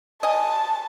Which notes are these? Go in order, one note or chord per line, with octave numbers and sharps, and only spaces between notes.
D#5 G#5 A5